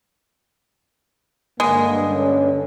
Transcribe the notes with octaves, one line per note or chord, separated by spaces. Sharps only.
G2 D3 G#3 A#3
C#4